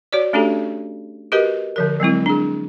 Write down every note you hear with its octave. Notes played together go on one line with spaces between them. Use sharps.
F#4 C#5 D5
A3 C#4 D4 F#4 G4 A4
F#4 G4 A#4 B4 D#5
D3 F3 A#4
F#3 G#3 C4 E4
D4 G#4